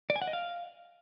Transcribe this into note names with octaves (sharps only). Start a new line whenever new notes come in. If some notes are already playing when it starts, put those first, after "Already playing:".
D5
G#5
F#5
D#5
F5